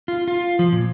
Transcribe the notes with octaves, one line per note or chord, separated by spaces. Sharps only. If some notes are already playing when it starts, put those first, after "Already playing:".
F4
F4
F3
A#2